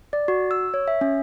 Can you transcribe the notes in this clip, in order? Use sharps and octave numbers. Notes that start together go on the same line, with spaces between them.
D5
F#4
E6
C#5
E5
C#4